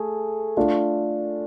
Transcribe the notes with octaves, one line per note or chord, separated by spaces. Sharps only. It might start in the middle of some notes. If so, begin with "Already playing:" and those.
Already playing: A3 G#4
A3 D4 F4